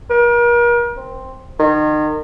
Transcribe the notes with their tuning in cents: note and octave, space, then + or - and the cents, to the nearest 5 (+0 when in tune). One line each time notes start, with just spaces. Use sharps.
A#4 +40
C4 +5
D#3 -35